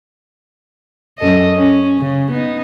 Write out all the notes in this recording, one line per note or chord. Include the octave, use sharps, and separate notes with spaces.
F#2 A4 D#5
C#4
C#3
B3 D#4